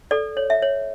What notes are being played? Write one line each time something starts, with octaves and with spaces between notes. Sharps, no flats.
A4 D5
C#5
E5
C#5